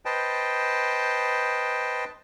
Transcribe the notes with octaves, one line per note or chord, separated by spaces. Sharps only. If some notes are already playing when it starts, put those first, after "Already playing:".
B4 C5 D#5 G5 A5